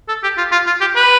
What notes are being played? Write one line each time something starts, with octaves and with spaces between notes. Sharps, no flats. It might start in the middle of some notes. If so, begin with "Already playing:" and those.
A4
G4
F4
F4
F4
G4
B4